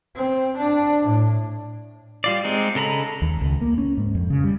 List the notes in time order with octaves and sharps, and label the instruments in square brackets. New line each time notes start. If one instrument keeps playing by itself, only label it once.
[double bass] C4
D4
A2
[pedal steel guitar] G3 F4 D5
G#3 C4 D#4
C#3 A4 A#5 B5
[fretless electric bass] D#2
C#2
A#3
C#4
G#2
F2
C#3
G3